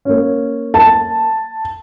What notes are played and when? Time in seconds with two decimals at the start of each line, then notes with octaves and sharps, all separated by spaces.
0.05 A#3 C#4
0.74 A5